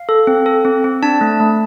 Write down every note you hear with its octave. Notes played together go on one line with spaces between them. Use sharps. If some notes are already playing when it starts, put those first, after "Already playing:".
Already playing: F5
A4
C4
A4
C4
C4
D4 A5
A3
A3